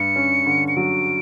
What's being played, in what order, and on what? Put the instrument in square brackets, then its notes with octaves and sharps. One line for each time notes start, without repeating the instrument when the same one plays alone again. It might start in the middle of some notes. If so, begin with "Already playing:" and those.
Already playing: [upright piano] G2 [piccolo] C#7
[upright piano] C#4
D3
[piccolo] C#7
[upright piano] F#3 [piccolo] D7